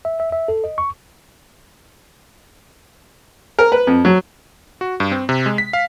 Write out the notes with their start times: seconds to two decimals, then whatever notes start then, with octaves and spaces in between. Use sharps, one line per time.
0.05 E5
0.20 E5
0.32 E5
0.48 A4
0.64 D#5
0.78 C#6
3.59 A#4
3.72 B4
3.87 F2
4.05 F#3
4.81 F#4
5.00 G2
5.12 C4
5.29 C3
5.46 G#3
5.58 B6
5.73 F5